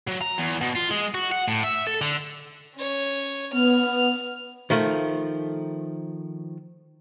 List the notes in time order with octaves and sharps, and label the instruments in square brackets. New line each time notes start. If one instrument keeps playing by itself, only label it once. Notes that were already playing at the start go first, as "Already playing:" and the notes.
[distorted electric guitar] F#3
A#5
E2
B2
F4
G#3
F#4
F#5
A2
E5
A4
D3
[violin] C#4 C#5
[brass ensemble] B3 [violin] F6
[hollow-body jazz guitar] D#3 F3 A3